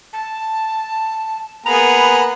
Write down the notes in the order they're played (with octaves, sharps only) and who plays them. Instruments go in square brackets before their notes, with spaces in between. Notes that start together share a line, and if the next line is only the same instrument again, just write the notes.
[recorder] A5
[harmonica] A#3 B3 G#4 [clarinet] A#5 [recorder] B5